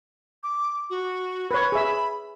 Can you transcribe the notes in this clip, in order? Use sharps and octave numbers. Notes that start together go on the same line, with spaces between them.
D6
F#4
B4 C#5 B5
G#4 E5